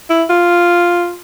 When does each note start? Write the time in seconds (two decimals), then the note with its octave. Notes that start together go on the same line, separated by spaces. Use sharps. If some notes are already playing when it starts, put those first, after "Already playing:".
0.10 E4
0.29 F4